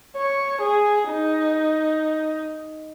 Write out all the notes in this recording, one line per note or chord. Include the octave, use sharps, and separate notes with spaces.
C#5
G#4
D#4